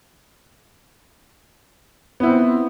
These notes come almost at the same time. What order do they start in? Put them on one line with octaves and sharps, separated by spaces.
B3 E4 C4